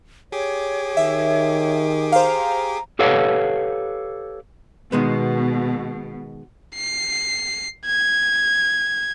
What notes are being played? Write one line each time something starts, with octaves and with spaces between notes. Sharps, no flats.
G4 G#4 C#5 D6
D#3 E5
C5 F5 A#5
G4 A4 B4 C#5 F5 F#5
B2 D#3 G#3 B3
C7
G#6